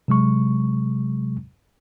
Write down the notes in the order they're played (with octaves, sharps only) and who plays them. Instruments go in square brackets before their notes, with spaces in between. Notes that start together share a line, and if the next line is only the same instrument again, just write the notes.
[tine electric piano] C3 F#3 G#3 C#6